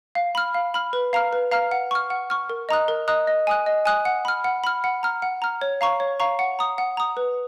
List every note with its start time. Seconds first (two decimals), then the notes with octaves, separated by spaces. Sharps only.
0.15 F5
0.35 B5 F6
0.54 F5
0.74 B5 F6
0.93 B4
1.13 F5 A#5 F6
1.33 B4
1.52 F5 A#5 F6
1.71 F#5
1.91 C#6 F6
2.10 F#5
2.30 C#6 F6
2.50 A#4
2.69 D#5 A#5 D#6 F#6
2.88 A#4
3.08 D#5 A#5 D#6 F#6
3.27 D#5
3.47 G#5 D#6 F#6
3.66 D#5
3.86 G#5 D#6 F#6
4.05 F#5
4.25 B5 F6
4.44 F#5
4.64 B5 F6
4.84 F#5
5.03 A#5 F6
5.22 F#5
5.42 A#5 F6
5.62 C#5
5.81 F5 A#5 C#6
6.00 C#5
6.20 F5 A#5 C#6
6.39 F#5
6.59 A#5 D#6
6.78 F#5
6.97 A#5 D#6
7.17 B4